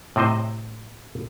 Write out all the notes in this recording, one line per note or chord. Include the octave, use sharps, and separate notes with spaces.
A2 C3 C4 C5 D#5